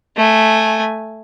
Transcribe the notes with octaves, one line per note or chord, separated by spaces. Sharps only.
A3 G#5